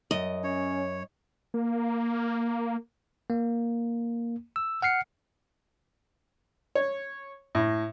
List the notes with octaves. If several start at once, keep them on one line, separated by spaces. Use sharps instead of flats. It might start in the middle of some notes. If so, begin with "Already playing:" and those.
F#2 D#5
C#4 C#5
A#3
A#3
E6
F#5 F6 C7 C#7
C#5
A2